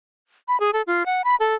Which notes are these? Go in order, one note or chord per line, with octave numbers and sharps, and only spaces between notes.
B5
G#4
A4
F4
F#5
B5
A4